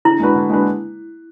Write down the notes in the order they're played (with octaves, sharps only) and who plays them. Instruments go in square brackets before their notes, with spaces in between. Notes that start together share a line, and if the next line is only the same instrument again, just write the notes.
[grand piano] D3 [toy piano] E4
[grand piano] G#3 D4 F#4 B4
D3
G#3 D4 F#4 B4